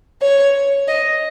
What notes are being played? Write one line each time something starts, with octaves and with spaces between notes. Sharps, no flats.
C#5
D#5